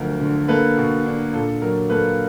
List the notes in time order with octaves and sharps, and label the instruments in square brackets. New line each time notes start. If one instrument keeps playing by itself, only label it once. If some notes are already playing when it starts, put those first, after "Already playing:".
Already playing: [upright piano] D2 F3 F#3 A#4
D3
A#3 A4 B4
B2
D4
A#2 A4
F#3 A#4
A#3 A4 B4